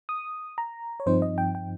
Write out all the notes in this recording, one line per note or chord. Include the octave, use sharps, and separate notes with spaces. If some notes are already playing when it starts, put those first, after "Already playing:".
D#6
A#5
C#5
G2 F3 C4 D#4 C5
D#5
G5
G5